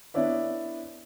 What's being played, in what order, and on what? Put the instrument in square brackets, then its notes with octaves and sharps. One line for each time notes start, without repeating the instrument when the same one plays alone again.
[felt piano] B3 D4 E4 C#5 D5 E5